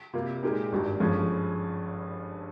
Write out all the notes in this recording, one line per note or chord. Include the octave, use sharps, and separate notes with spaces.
C3 G3 A#3 F4
A#2 G#3 D#4 G4 A#4
G#1 G2 G3
G1 G2 F3 G#3 C#4